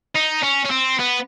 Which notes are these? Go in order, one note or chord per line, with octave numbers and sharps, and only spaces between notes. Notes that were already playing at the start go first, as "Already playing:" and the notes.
D#4
C#4
C#4
C4
B3